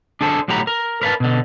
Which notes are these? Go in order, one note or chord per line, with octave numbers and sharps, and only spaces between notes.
D4 G#4 A4 C5
B1 A2 F#4 G4 A#5 B5
A#4
A#4 B4 F5 A5
B2 D3